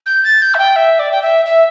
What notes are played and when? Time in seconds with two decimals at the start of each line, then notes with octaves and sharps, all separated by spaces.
0.06 G6
0.24 A6
0.42 G6
0.54 E5
0.59 G5
0.76 E5
0.99 D5
1.12 G5
1.22 E5
1.45 E5